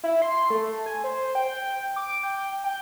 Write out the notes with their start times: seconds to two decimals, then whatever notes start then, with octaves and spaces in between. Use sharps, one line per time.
0.04 E4
0.22 C6
0.50 A3
0.86 G#5
1.04 C5
1.35 G5
1.96 D6
2.23 G5
2.64 G5